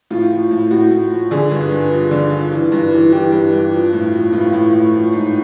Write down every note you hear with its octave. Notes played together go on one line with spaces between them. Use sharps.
A2 F4
F3
A2
A2 F#4
A2
F3
D3 G#4
G2
G2
F3
D3
F3
E3
G2
E3
E3 G4
G2
G2
F3
A2
F3
A2 F4
A2
A2
F3
G#2